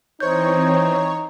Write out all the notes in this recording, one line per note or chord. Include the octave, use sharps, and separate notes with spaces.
E3 C4 D#4 C5 C#5 G6